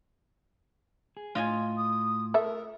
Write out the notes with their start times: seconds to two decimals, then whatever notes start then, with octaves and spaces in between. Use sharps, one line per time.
1.17 G#4
1.35 A2 F4 D#5 G#5
1.77 D#6
2.34 A3 A#4 E5